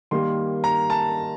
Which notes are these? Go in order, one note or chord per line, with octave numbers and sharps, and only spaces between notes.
D#3 G3 A#3 C6
A#5
A5